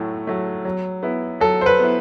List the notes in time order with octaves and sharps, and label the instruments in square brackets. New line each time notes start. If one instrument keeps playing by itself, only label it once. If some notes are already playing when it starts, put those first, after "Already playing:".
Already playing: [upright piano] A2 F#3 A3
F#3 A3
F#3
B3 E4
[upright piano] F#3 [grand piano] A4
[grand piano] C5
B4
[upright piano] B3 E4